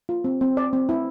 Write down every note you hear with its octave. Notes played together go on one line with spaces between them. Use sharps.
F4
C4
C4
D5
C4
E4